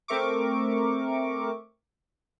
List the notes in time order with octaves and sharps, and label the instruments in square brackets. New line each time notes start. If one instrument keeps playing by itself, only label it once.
[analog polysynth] A3 C4 A#4 E5 C#6 D6